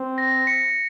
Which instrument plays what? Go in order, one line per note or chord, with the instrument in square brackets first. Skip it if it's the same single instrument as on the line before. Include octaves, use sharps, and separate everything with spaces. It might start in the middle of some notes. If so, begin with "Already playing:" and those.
Already playing: [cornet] C4
[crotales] A#6
B6 C#7